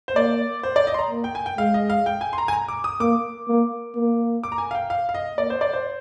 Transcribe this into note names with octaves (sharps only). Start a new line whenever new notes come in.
C5
A#3 D5
C5
D5
D#5
C6
A#5
A#3
G5
G#5
G5
G#3 F5
D#5
F5
G5
G#5
C6
A#5
G#5
A#5
D6
D#6
A#3 D6
A#3
A#3
D6
A#5
G#5
F5
G5
F5
F5
D#5
A#3 D5
C5
D5
C5